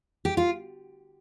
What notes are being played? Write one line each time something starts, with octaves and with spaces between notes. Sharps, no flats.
G4
F4